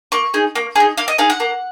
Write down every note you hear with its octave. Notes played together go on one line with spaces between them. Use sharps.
A#3 C#6
D#4 G#4
A#3
D#4 G#4
A#3 F5
D#5
D#4 G#4 F5
F#5
A#3